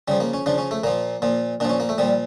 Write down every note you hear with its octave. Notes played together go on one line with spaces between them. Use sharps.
C#3 F3 G3
A#3
C#4
C#3 F3 D4
C#4
A3
A#2 F3 A#3
A#2 F3
A#2 F3 C#4 D4
A#3
A3
A#2 F3 G3